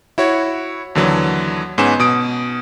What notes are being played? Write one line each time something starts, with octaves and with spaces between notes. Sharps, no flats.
E4 F#4 C#5
D#2 D3 E3 F#3
G#2 B3 C#4 G#5 E7
B2 D#6 D7